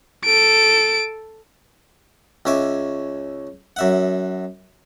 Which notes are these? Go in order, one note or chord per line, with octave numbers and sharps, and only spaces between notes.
A4 D7
C#2 C#4 E5 D6
F#2 E5 F#5